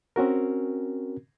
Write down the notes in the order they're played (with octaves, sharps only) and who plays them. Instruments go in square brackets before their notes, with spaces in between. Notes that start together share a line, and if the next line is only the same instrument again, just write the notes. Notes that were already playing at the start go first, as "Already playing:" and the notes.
[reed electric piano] C4 C#4 F#4 A#4